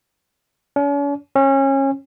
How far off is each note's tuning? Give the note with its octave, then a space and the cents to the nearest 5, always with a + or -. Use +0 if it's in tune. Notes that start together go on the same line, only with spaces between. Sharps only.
C#4 +45
C#4 -25